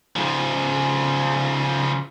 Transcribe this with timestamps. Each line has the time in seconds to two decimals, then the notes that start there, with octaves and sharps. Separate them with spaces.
0.16 C#3 F3